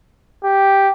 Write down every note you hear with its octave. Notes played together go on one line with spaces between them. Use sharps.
G4